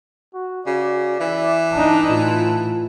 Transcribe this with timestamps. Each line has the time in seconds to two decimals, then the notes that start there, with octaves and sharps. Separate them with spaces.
0.34 F#4
0.67 C#3 F#4 D5
1.20 E3 E5
1.73 D4 D#4 A5
2.11 A2 F4